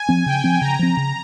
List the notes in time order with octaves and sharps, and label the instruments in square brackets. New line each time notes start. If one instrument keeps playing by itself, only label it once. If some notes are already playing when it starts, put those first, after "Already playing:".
Already playing: [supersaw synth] G#5
[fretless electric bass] F3 C4
[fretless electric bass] C#3 [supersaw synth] G5
[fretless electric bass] F3 C4
[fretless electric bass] C#3 [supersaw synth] A#5
[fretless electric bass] F3 C4
C#3